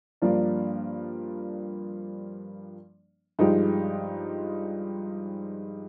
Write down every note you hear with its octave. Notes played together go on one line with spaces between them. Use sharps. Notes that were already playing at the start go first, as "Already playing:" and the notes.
G2 F3 A#3 D4
G2 F3 G#3 D#4 G4